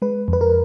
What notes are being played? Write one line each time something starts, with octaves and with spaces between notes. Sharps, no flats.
G#3 B4
F2
B4
A#4